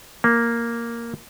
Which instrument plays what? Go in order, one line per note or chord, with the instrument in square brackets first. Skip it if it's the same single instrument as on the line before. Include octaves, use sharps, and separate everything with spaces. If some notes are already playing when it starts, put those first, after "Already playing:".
[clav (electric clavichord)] A#3